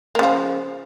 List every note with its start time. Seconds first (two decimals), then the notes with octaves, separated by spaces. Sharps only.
0.15 A#3
0.19 C#3
0.23 F3